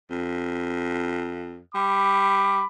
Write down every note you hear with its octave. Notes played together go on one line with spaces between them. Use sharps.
F2
G3 B5 D6